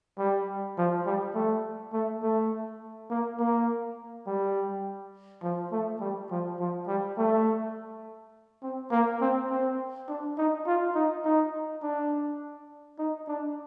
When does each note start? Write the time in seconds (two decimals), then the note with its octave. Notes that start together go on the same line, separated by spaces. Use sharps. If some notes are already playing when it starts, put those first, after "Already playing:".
0.18 G3
0.78 F3
1.06 G3
1.35 A3
1.93 A3
2.23 A3
3.10 A#3
3.40 A#3
4.27 G3
5.43 F3
5.72 A3
6.01 G3
6.31 F3
6.60 F3
6.88 G3
7.18 A3
8.63 C4
8.92 A#3
9.21 C4
9.50 C4
10.09 D4
10.38 D#4
10.67 F4
10.95 D#4
11.25 D#4
11.83 D4
12.99 D#4
13.28 D4